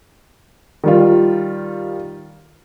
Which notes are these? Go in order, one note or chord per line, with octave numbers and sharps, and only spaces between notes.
D#3 G3 F4